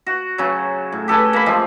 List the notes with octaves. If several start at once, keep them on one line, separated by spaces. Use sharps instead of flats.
F#4
C#3 F#3
A2
G4 A4 B4 G#5
A#3 B5
F3 G#3 A3 F4